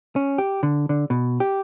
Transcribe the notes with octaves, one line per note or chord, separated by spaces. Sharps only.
C#4
G4
D3
D3
B2
G4